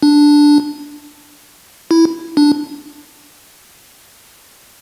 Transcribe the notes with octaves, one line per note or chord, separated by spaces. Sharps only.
D4
E4
D4